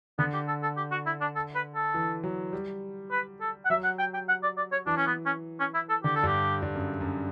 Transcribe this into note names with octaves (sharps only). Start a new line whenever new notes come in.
D3 B3
G4
A4
A4
G4
F#4
E4
D4
A4
B4
A4
E3
F#3
G3
B4
A4
F#5
F#3 E5
F#5
G5
G5
F#5
D5
D5
C#5
E3 D4
C#4
B3
C#4
C#4
E4
A4
D3 G4
A4
G2 G4
G2
F#2
F#2